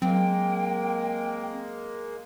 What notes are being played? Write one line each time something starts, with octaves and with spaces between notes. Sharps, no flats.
F#3 G#3 A#3 C4 G5